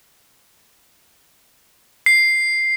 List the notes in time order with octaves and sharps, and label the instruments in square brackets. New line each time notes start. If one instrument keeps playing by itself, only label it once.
[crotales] C7